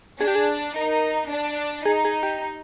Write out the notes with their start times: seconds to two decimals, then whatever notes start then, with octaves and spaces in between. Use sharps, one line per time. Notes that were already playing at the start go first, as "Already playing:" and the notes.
0.20 D4 G#4
0.28 G4
0.35 G#4
0.76 D#4 A#4
1.30 D4
1.86 D#4 G#4
2.05 G#4
2.23 G4